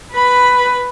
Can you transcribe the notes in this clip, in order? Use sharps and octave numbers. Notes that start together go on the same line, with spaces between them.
B4 B5